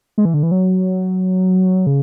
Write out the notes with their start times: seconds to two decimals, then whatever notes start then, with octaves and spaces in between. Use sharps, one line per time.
0.18 G#3
0.25 E3
0.34 D3
0.43 E3
0.52 F#3
1.87 C#3